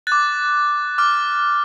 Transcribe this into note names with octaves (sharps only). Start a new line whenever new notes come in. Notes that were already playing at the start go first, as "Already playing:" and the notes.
D6 F#6 A6
D6 F6